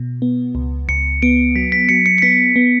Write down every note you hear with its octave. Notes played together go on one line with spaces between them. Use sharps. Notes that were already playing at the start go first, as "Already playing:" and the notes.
Already playing: B2
B3
C#2
C#2 C#7
B3 D7
F#3 B6
B6
F#3 C#7
C#7
C#7
B3 B6
B3